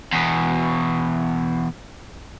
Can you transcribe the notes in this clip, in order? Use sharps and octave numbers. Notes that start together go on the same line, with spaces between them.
E2 B2